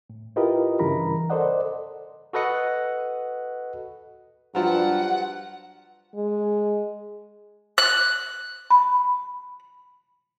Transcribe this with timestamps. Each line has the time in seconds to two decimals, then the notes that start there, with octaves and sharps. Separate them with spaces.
0.10 A2
0.36 E4 F4 G4 A#4 B4 D#5
0.79 G2 C#3 E3 A#4 A#5 B5
1.30 A4 A#4 C5 D5 D#5 F#5
2.33 F#4 A4 B4 D#5 F#5
4.55 G2 F3 F#3 F#5
6.15 G#3
7.78 F#6
8.70 B5